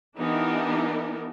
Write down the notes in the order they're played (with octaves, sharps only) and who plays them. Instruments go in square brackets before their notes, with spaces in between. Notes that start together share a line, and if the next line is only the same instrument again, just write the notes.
[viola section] E3 B3 D4 D#4 G4 A#4